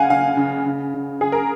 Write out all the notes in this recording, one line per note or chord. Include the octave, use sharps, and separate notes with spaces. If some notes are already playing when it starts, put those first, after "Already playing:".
Already playing: C#3 F5 F#5 G#5
C#3 F5
C#3
C#3
C#3
C#3 G#4
A#4